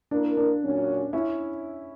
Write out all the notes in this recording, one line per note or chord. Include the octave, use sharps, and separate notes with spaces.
A#3 D4 E4 A#4
D4
A#2 F#3 C#4 F#4
C#4 E4